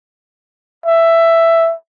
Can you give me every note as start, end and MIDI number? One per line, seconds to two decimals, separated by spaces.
0.86 1.74 76